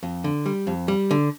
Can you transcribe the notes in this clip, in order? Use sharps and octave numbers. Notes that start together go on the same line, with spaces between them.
F2
D3
G3
F2
G3
D3